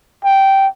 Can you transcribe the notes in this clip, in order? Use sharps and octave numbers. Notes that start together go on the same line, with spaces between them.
G5